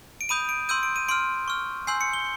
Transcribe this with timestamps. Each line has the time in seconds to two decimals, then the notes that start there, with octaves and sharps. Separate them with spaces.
0.21 D7
0.29 B5 D#6 G6 D#7
0.49 D7
0.69 C6 E6 G6 D#7
0.83 D7
0.96 D#7
1.08 C6 F6 D7
1.48 C#6 F6
1.87 G#5 C6 E6 G6 C7
2.01 C#7
2.13 G7